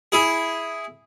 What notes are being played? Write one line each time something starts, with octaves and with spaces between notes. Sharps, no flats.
E4 G#4